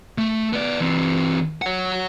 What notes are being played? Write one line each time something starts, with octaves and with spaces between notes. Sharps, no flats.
A3
B3 D5
E3 C4
C#5 F#5